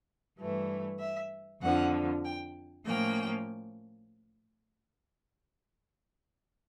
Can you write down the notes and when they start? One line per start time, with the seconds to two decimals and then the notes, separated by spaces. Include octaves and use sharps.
0.38 G2 E3 A3
1.00 E5
1.62 F2 D3 F3 F#5
2.25 G5
2.86 A2 F3 A#3 C#4 G5